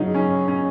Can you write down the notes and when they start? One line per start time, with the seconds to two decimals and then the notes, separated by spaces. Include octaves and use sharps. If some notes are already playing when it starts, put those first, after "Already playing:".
Already playing: C#3 F#3 D#4
0.14 C#4
0.48 C#4